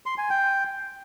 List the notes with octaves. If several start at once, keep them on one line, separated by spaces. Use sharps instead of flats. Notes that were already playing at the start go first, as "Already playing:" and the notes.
C6
G#5
G5